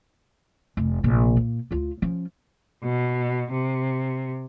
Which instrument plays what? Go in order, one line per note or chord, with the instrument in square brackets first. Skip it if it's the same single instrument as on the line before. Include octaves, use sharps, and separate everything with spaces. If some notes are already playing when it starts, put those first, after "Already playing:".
[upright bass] F1
A#1 C3
A#2
D2 F4
F3 C#4
[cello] B2
C3